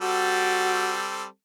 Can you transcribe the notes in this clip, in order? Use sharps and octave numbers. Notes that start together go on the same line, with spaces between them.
G3 C4 F#4 A4